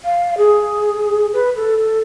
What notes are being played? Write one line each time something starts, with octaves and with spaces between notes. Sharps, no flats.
F5
G#4
B4
A4
A4